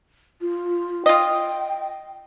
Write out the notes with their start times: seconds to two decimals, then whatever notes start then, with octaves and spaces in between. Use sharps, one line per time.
0.41 F4
1.06 F4 D#5 G5